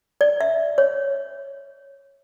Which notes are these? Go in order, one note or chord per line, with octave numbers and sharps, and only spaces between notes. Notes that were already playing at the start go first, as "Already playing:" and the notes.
D5
E5
C#5